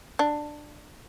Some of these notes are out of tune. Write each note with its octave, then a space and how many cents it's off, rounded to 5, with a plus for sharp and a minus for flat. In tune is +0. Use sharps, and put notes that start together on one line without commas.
D4 +15